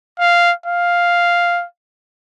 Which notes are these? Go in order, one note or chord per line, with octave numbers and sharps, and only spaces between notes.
F5
F5